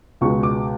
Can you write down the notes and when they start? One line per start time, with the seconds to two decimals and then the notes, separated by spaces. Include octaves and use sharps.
0.21 C#2 B2 G#3 C#6
0.43 D6